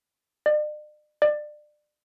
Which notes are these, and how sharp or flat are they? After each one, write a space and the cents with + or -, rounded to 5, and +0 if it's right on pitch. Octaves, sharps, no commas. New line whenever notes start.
D5 +45
D5 +30